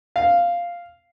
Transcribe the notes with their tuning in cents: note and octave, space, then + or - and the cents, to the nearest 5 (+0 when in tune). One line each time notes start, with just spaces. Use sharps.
F5 -5